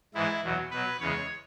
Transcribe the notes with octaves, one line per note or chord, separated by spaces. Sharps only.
G#2 E3 G#3 E4
E2 B2 F#3
B2 F#3 B4
E2 C#3 G#3 C#5